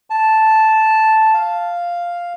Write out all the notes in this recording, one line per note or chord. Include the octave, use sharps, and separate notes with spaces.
A5
F5